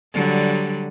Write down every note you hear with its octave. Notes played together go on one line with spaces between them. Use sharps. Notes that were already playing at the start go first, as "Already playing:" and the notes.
D3 F#3 G3